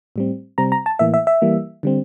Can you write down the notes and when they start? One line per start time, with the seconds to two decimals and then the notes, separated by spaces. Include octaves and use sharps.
0.16 A2 G3 C4
0.58 C3 G3 C4 A#5
0.72 A#5
0.86 A5
0.99 A2 E3 A#3 E5
1.14 E5
1.27 E5
1.42 E3 G3 A#3
1.83 D3 G3 C4